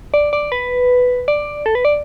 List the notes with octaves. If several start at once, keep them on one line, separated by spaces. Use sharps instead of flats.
D5
D5
B4
D5
A4
B4
D5